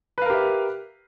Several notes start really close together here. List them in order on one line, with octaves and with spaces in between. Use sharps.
B4 F5 A#4 G4 E5